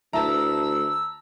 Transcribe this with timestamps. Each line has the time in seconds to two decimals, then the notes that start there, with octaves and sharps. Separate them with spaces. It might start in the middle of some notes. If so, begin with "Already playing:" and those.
0.13 D2 E4 B4 A5 A#5 E6